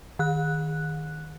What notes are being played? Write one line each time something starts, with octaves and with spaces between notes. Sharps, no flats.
D#3 F#6